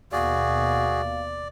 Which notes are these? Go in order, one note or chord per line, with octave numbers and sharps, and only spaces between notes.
D#2 B2 F#4 G#4 D5 F5